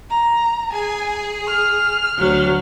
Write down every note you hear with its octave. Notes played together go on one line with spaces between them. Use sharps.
A#5
G#4 G#5
F6
D2 F#3